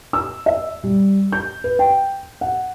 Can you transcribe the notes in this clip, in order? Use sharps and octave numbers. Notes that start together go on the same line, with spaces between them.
E6
E5
G3
G6
B4
G5
F#5